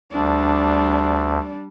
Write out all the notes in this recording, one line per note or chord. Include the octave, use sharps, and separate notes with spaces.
D2 G3 D4